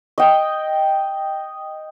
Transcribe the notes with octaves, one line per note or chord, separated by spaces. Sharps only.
D#5 G5